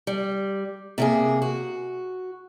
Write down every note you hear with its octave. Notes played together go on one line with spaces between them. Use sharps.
G3
C3 A#3 G#4
F#4